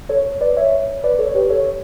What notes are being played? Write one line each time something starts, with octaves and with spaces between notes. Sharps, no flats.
A4 C#5
B4 D5
C#5 E5
B4 D5
A4 C#5
C#5
G4 B4
A4 C#5